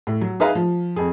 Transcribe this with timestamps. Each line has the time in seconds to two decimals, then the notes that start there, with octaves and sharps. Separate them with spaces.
0.07 A2
0.21 F#3
0.40 D#4 G#4 B4 E5 F5 A#5
0.55 F3
0.96 F2 G#4